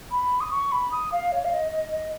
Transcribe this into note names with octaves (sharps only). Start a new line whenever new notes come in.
B5
D#6
C#6
B5
D#6
F5
C#5
F5
D#5
D#5
D#5